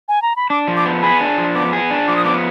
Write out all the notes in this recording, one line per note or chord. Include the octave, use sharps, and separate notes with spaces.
G#5
A#5
B5
D4 D6
F3
D6
B3
G#4 B5
D4
F3
B3 D6
G#4
D4
F3 D6
D#6
B3 D6